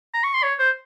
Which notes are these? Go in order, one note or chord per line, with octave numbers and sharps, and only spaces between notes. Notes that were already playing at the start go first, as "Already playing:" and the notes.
A#5
C#6
C6
C#5
C5